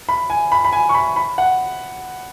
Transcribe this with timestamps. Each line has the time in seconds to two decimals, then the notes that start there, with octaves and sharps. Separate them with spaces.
0.09 B5
0.30 G#5
0.52 B5
0.65 B5
0.73 G#5
0.89 C#6
0.94 B5
1.16 B5
1.38 F#5